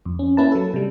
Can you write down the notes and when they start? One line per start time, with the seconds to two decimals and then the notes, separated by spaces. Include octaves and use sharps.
0.06 F2
0.19 C#4
0.37 A#3 C#4 E4 B4 A5
0.52 F#3 A4
0.74 C3 G3